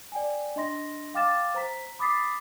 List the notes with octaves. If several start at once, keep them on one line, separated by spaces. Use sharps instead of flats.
D5 G5 G#5
D4 D#5 C6 A#6
F5 G5 D6 F6 A6 E7
C5 A#5 B6
B5 D6 D#6 A6 B6 C7